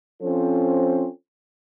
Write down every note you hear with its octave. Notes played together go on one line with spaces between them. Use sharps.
F3 C4 C#4 F4 A4 C5